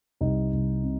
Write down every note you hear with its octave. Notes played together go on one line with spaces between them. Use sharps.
C2 D#4
C2
C3